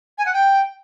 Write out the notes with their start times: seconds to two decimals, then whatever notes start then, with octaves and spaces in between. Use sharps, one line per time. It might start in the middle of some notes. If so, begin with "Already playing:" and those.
0.18 G#5
0.26 F#5
0.33 G5